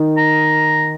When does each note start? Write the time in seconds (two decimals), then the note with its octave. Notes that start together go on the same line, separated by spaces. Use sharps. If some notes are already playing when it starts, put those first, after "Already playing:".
Already playing: D#3
0.17 A#5